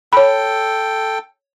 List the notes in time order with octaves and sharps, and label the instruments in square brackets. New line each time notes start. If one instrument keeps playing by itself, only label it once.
[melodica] A4 G5 [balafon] C#5 B5